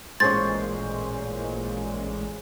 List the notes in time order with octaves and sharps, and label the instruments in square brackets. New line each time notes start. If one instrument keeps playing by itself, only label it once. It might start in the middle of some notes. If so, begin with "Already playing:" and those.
[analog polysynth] A1 A#2 G#3 [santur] C#4 G#4 C5 [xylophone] A6